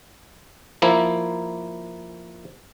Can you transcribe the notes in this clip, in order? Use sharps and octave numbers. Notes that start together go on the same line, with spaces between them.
F3 A#3 E4